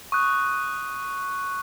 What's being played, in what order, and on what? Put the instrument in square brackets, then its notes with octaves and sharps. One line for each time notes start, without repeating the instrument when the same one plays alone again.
[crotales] C#6 D#6 F#6